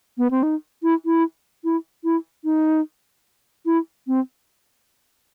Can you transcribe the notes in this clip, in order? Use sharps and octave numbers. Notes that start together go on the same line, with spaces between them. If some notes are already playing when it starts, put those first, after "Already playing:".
B3
C4
D#4
E4
E4
E4
E4
D#4
E4
C4